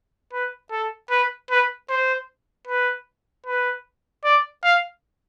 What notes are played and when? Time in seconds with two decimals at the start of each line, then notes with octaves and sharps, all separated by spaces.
0.33 B4
0.71 A4
1.10 B4
1.51 B4
1.89 C5
2.67 B4
3.46 B4
4.24 D5
4.64 F5